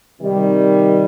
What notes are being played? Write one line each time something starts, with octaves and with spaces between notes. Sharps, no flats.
C3 D#3 G3